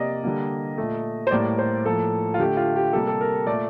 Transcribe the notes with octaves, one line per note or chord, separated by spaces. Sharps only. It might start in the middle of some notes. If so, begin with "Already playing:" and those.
Already playing: C3 A#3 D5 D#5
D3 G3 A#3
A#2 A3
C5
A2 G3 A#3 D5
C5
A2 F3 A#3 A4
F4
D3 A3 G4
F4
G4
C3 G3 A#3 A4
A4
A#4
A#2 A3 D5